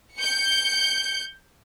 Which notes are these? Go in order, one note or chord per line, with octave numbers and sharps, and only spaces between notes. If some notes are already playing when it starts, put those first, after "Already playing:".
G6 C#7